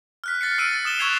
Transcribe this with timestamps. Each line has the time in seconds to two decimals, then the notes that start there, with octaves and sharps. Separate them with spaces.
0.24 F6 F#6 B6
0.41 F6 A6 C7 C#7
0.58 E6 F6 A6 D7 D#7
0.71 A6
0.85 D#6 E7 G7
0.99 C#6 E6 F#6 G#6 C7 F7